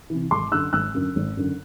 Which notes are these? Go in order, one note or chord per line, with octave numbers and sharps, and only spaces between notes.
C3 E3
G#1 C6 D6
F#2 D3 E6 F#6
G#1 E6 F#6
F#2 D3
G#1
F#2 D3